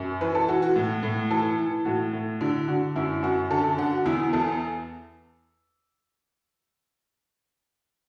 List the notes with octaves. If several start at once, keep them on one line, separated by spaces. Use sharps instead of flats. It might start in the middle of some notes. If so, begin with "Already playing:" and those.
Already playing: F#2
E3 B4
A4
E3 F#4
F#4
A2
A2
E3 A4
E3
A2 F#4
A2
D3 E4
D3 F#4
F#2 E4
F#2 F#4
D3 A4
A4
D3 F#5
F#4
E2 E4
E2 A4